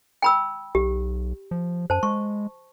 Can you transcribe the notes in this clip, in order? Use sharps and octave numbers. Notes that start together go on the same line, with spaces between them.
G5 B5 E6
B1 G4
F3
F#2 C5 A5
G#3 C#6